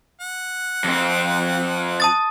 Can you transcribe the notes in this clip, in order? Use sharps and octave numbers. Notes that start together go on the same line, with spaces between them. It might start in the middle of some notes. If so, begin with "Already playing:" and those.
F#5
F2 C4
A5 D#6 A6